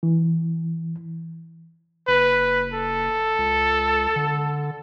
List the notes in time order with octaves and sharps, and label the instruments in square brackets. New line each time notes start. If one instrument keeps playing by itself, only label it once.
[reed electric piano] E3
[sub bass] F#1 [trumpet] B4
[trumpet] A4
[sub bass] C#2
D3